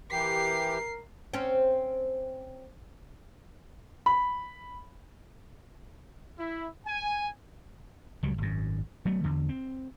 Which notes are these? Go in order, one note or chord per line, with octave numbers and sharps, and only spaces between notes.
E3 G4 A#4 C7
C4 C#4
B5
E4
G#5
C#2 F#3 G3
G#1 F#2
F#3 A3 B3
E2 D3
C4